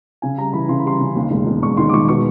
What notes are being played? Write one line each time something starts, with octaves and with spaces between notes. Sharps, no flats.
C#3 G#5
G3 A#5
E3 B5
C#3 C6
B5
G3 C6
C#3
D#2
E1
E1
E1 C#6
D#3 C6
D6
E1 C#6
B2 C#6